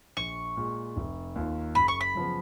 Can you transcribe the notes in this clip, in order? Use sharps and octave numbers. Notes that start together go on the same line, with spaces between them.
A#1 C#6
A#2 G#3
F1
D#2 D#3 A#3 F4
F#1 B5
C#6
B5
F#2 C#3 F3 B3